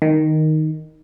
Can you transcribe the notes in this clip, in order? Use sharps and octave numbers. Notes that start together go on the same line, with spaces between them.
D#3